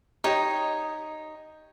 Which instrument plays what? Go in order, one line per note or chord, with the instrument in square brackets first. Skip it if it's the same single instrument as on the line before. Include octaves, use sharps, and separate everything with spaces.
[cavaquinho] D#4 C#5 [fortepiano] G4 D#5